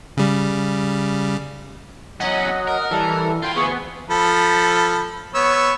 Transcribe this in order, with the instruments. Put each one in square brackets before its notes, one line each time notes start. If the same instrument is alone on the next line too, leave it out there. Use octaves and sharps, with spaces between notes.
[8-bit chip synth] C#3 G3
[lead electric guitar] E2 C#4 [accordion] F#3 [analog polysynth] D#5 F#5
[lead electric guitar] A#4
[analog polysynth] E3 [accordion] G3 A4
[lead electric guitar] E4 F4 [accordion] G5 C6
[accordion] D2 G#4 C#6 [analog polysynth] B3
[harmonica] F3 A4 B5
B3 C#5 E6